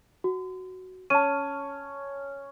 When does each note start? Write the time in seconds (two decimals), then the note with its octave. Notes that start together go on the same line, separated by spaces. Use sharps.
0.24 F#4
1.10 C#4 A5 D#7